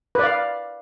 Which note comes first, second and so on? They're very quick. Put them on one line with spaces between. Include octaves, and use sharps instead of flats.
B4 D5 F5